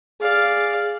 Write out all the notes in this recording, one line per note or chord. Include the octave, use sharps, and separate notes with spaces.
G#4 D5 F5